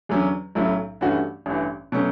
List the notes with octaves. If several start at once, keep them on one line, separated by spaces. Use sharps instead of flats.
E2 D3 F#3 C#4
B1 A2 F#3 C#4 E4
G2 E3 A3 C#4 F#4
A1 G2 E3
B2 F#3 A3 C#4